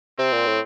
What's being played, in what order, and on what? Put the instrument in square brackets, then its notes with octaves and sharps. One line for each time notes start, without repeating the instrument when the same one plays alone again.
[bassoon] C3 [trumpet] C4
[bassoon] A#2
A2